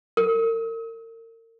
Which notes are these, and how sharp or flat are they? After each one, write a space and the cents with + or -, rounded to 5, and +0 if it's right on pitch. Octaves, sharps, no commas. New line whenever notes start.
A#4 -40